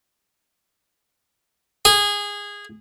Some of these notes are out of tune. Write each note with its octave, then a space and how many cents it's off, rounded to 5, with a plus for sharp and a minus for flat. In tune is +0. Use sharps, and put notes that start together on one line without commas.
G#4 -20